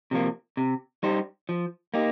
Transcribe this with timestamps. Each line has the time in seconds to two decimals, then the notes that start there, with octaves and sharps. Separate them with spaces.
0.11 C3 F3 A#3
0.57 C3
1.03 G3 D#4 G4 C5
1.49 F3
1.94 A#3 D#4 G4